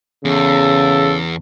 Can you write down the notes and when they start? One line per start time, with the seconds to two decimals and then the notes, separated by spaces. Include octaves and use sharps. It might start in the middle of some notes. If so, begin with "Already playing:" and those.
0.25 E2 C#3 A4